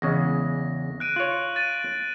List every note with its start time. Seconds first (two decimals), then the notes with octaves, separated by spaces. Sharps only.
0.02 E2 C#3 G#3 A#6
1.00 F#6 D7 D#7
1.16 F4 C#5 F#6 F#7
1.55 F#6 A6 D#7